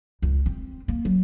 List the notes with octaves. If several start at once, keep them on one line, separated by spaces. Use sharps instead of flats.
C#2
C4
A#3
F#3